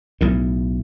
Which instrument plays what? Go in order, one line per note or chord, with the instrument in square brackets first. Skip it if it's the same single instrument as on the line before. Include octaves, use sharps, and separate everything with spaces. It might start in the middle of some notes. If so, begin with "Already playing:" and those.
[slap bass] B1 A2